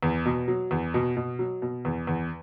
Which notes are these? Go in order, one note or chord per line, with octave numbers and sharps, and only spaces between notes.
E2
B2
F#3
E2
B2
B2
F#3
B2
E2
E2